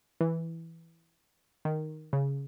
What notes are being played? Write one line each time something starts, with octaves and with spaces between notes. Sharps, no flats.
E3
D#3
C#3